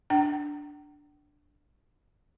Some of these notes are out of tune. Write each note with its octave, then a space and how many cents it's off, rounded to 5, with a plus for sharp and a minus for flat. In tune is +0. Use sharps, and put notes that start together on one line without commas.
D4 +0 G5 -45